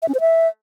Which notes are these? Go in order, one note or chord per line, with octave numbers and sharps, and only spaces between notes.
E5
C#4
C5
E5